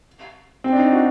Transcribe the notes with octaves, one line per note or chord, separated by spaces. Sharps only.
C4
D4
D#4
F#4